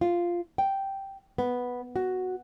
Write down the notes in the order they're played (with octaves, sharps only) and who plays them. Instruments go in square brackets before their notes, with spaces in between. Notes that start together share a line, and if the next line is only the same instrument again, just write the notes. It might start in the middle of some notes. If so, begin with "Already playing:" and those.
[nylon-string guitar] F4
G5
B3
F#4